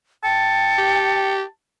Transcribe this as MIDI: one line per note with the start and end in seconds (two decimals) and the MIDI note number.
0.24 1.33 79
0.24 1.48 81
0.24 1.33 97
0.78 1.43 67